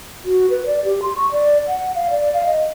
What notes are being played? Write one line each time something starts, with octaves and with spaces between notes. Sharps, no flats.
F#4
B4
D5
G4
C6
C#6
D5
F#5
F5
D5
F5
D#5